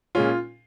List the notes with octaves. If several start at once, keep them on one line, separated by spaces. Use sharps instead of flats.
A#2 G#3 C#4 F4